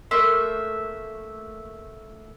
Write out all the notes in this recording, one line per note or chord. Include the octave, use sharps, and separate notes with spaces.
A3 A#3 E5 C6